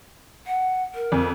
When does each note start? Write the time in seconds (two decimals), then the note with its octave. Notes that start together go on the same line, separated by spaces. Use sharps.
0.47 F#5
0.95 A#4
1.12 F2